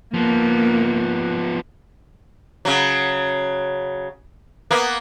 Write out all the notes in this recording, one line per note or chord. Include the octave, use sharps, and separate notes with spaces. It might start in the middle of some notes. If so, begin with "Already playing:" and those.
F3 A#3 B3
C#3 F#3
A#3 B3